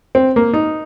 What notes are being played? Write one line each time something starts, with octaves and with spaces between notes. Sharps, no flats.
C4
A#3
D#4